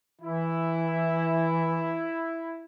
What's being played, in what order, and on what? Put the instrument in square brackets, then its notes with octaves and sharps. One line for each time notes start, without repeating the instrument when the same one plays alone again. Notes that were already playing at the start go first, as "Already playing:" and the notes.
[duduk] E3 [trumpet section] E4